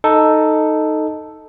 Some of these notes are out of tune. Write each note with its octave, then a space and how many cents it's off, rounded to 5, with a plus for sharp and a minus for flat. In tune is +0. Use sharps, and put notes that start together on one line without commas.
D#4 +0 A4 +0